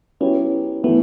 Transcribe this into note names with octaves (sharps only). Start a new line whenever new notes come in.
F#3 B3 C#4 E4 G4 C#5
E3 A3 B3 E4